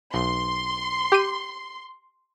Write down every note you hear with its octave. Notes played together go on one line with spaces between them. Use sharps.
B1 C6
G4 D#7